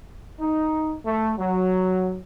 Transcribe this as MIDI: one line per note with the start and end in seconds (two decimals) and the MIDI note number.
0.40 0.97 63
1.06 1.33 57
1.39 2.18 54